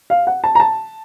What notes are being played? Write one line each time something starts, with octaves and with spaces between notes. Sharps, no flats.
F5
F#5
A5
A#5
A5